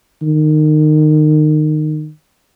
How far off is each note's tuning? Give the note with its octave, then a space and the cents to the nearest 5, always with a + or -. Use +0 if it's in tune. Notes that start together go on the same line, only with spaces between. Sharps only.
D#3 -25